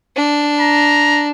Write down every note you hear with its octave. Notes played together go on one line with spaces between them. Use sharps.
D4
A#5